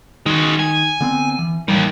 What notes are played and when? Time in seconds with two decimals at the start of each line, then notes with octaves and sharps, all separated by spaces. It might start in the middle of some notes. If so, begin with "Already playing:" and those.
0.26 D#3 G#3 F#4
0.59 G#5
1.01 D3 B3 C4
1.39 E3
1.68 D#2 A2 D#3 E3 G3